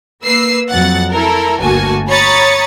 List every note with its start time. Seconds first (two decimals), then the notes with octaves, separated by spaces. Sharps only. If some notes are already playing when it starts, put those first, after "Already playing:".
0.25 A#3 B4 E6 C7
0.71 F2 F#3 F#5 A6
1.12 A3 E4 A4 A#4
1.60 G1 D2 A#3 F#4 G#5 A5
2.08 C#5 A#5 B5 D#6 A6 C#7